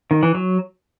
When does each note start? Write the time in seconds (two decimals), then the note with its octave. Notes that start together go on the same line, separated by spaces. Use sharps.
0.11 D#3
0.23 E3
0.35 F#3